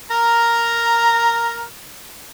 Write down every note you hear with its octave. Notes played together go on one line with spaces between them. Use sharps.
A#4 A#5